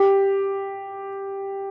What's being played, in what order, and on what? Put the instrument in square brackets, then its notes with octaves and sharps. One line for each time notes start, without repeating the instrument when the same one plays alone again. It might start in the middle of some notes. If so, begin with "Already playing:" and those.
Already playing: [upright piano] G4